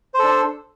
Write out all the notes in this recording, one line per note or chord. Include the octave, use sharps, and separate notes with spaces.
D4 A4 C5